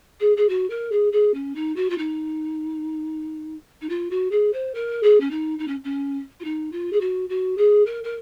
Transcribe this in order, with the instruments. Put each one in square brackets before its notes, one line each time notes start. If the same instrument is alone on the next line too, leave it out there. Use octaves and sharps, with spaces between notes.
[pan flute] G#4
G#4
F#4
A#4
G#4
G#4
C#4
D#4
F#4
F4
D#4
D#4
F4
F#4
G#4
C5
A#4
G#4
C#4
D#4
D#4
C#4
C#4
F4
D#4
F4
G#4
F#4
F#4
G#4
A#4
A#4